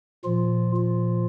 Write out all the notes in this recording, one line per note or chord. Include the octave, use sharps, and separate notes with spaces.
A#2 F3 F4
F4